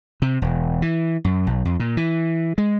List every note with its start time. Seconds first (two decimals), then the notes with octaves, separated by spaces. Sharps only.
0.22 C3
0.42 E1
0.82 E3
1.25 F#2
1.47 B1
1.65 F2
1.80 A#2
1.97 E3
2.58 G#3